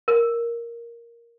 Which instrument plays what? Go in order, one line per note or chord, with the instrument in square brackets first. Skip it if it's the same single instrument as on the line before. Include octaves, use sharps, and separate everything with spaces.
[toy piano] A#4